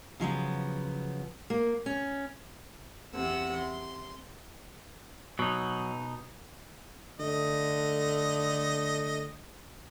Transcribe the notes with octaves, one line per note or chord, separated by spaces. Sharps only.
C#3 F3 F#3 B3
A#3
C#4
E2 C3 F#5 E6
C6
B2 F#3 D#4
D3 A3 D#5